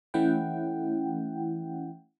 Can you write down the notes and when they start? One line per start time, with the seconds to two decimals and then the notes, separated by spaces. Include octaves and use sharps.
0.14 E3 A3 C#4 E4 F#5 G5